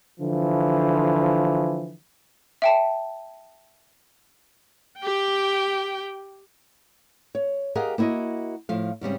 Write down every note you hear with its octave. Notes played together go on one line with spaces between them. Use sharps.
D3 E3 F3
E5 G5 A5
G4 G5
C#5
G4 G#4 A#4 D#5 F5 F#5
A#3 B3 E4 F#4 D#5
A2 F3 F5
G#2 C#3 G3 C4